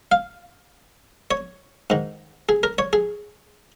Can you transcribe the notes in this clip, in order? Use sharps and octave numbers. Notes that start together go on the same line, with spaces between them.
F5
C#5
G#2 D#3
G#4
A#4
C#5
G#4